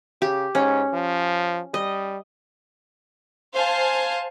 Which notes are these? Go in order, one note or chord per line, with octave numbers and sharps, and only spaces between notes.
C#3 G4
G#2 C#4
F3
G3 D#5
C5 F5 G#5 A5